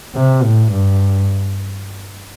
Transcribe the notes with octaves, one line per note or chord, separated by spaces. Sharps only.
C3
A2
G2